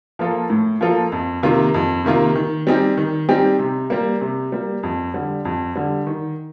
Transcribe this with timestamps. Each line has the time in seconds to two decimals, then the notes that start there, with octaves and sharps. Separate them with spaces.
0.19 F3 A#3 F4 A4
0.50 A2
0.81 F3 A#3 F4 A4
1.12 F2
1.43 C3 D#3 A#3 F4
1.74 F2
2.05 C3 D#3 A#3 F4
2.35 D#3
2.67 G3 C4 D#4 G4
2.97 D#3
3.29 G3 C4 D#4 G4
3.59 C3
3.90 G3 A#3
4.21 C3
4.52 G3 A#3
4.83 F2
5.14 D3 G3
5.45 F2
5.76 D3 G3
6.07 D#3